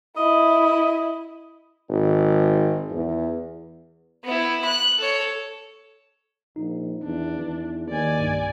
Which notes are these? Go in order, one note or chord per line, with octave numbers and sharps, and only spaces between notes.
E4 D#5
G#1
E2
B3 E4
F#6
A4 C#5
A#1 D#4
E2 D4
E2
D#2 D5 G#5
B1 G2